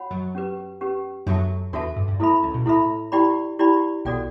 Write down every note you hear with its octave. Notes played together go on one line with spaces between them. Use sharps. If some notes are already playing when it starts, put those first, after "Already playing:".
Already playing: F#4 C#5 F#5 B5
F#2 F#3
C#4 G4 B4
C#4 G4 B4
F#2 F#3 D4 F#4 A4 E5 A5
E2 E3 D4 F#4 A4 E5 A5
G2
G2
A2 E4 A4 E5 B5
C#2 C#3
B1 B2
A2 E4 A4 E5 B5
E4 G4 D5 G5 B5
E4 G4 D5 G5 B5
B1 B2 F#4 A4 D5 G5